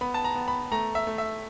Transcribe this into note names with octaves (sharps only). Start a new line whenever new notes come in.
B3 B5
A5
A#5
B3
B5
A3 A#5
E5
A3
E5